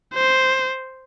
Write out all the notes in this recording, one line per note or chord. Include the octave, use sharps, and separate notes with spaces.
C5